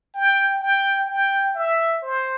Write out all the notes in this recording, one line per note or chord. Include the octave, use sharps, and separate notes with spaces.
G5
G5
G5
E5
C5